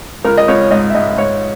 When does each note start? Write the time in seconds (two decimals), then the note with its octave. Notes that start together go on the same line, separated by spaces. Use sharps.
0.25 C#2 A#4
0.37 D#5
0.48 C#2 C#5
0.71 G#2 D#5
0.90 E5
0.94 G#2 D#5
1.17 G#2 C#5